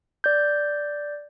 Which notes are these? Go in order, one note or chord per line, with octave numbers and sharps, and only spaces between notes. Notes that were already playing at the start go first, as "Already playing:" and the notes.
D5 G6